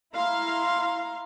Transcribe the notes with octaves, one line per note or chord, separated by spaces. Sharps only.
E4 F5 A#5 C6